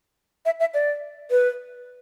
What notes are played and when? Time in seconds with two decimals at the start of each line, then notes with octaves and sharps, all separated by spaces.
0.46 E5
0.60 E5
0.74 D5
1.31 B4